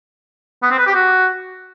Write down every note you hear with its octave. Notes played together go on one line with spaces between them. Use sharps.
B3
C4
B4
G4
F#4